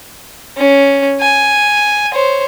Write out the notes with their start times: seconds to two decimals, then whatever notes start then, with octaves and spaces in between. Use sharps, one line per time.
0.56 C#4
1.20 G#5
2.13 C5 C#5